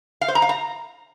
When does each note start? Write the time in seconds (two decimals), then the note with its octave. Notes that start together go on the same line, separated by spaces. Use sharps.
0.21 F5
0.28 C5
0.35 A#5
0.42 F5
0.49 A#5